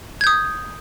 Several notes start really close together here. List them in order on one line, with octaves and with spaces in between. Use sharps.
G#6 G6 D#6